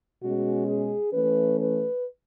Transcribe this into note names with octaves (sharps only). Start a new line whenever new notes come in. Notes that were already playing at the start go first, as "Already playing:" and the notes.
B2 G#3 C#4 F#4
G#4
E3 A3 C#4 B4
B4